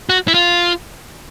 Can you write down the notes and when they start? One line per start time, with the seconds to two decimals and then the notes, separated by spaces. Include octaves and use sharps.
0.09 F#4
0.28 E4
0.34 F4